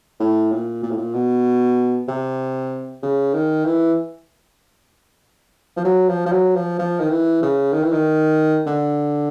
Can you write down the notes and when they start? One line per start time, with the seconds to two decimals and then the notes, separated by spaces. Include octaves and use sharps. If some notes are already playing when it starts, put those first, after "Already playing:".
0.20 A2
0.52 A#2
0.83 A#2
0.91 A2
0.97 A#2
1.14 B2
2.08 C3
3.03 C#3
3.34 D#3
3.65 E3
5.77 F3
5.85 F#3
6.09 F3
6.26 F3
6.32 F#3
6.56 F3
6.79 F3
7.00 D#3
7.10 E3
7.42 C#3
7.73 D#3
7.83 E3
7.92 D#3
8.67 D3